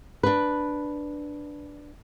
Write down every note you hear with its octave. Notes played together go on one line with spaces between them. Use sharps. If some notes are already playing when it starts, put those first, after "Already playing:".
D4 B4